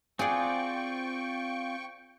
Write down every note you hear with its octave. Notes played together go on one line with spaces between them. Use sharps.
C4 F4 G#4 D5 F#5 G5 C#6